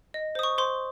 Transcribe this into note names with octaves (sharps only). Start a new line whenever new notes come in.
D#5
C5 D#6
C#6
C5 C6